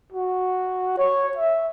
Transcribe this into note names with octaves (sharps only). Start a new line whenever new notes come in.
F#4
C#5
E5